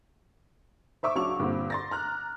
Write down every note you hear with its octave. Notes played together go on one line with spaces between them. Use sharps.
C5 E5 C#6 D6 E6
C#2 F#3 D4 C#6 F7
G2 A#2 D3 C4
C6 A6 A#6
A#5 F6 F#6